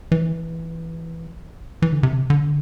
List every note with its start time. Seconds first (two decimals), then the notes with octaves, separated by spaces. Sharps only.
0.12 E3
1.82 E3
1.93 D3
2.03 C3
2.30 D3